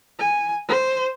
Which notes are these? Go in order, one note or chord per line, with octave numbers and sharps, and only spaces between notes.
G#5
C5